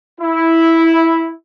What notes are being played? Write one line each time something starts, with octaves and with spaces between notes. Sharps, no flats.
E4